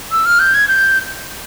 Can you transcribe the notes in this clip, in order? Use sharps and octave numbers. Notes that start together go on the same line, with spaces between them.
E6
F6
G6
G#6
G6